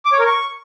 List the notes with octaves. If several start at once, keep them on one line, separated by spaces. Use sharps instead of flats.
D6
C#5
A#4
C#6